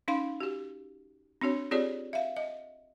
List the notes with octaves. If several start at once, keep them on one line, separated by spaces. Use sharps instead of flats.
C#4 D#4 F5 C6
F#4 G4
C4 D4 F#4 C#5
C4 F4 G4 G#4 C#5 D5
E5 F5
D#5